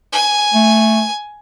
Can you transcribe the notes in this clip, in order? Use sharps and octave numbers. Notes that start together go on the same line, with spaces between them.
G#5
A3